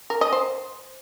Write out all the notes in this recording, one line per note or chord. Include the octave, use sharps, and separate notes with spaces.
A#4
D#5
C5